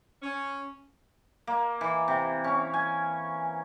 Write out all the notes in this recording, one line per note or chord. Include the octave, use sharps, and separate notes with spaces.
C#4
A#3
E3
C3
C#4
G#5